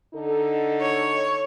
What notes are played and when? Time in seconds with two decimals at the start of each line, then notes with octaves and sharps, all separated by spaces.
0.14 D3 D#4 A4
0.81 C#5